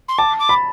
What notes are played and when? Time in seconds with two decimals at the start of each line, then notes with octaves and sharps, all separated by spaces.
0.08 C6
0.18 A5 D6
0.39 D6
0.49 B5